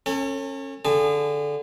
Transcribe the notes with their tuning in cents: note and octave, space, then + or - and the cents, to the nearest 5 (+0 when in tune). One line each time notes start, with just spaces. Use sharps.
C#4 -25 A4 +35
D3 -15 G#4 -35 A5 -30